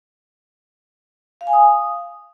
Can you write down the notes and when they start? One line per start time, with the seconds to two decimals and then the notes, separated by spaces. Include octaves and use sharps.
1.41 F5
1.47 G#5
1.53 D#6